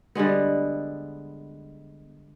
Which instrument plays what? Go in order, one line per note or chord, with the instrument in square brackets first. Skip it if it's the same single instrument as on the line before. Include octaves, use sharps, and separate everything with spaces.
[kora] D3 G3 G#3 B3